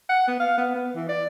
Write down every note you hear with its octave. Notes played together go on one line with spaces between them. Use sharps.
F#5
B3
F5
B3
B3
E3
D5